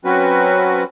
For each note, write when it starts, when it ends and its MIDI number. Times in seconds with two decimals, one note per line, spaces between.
0.05 0.83 54
0.05 0.83 60
0.05 0.83 61
0.05 0.83 66
0.05 0.83 71